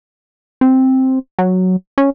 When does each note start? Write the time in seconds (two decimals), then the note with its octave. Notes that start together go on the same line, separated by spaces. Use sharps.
0.61 C4
1.39 F#3
1.98 C#4